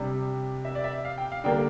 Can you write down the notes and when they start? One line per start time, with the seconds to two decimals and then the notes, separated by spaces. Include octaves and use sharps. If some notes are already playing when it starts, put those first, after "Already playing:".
Already playing: C3 G3 D4
0.65 E5
0.75 D5
0.84 E5
1.05 F5
1.17 G5
1.32 F5
1.44 D3 G3 A#3 D4 G5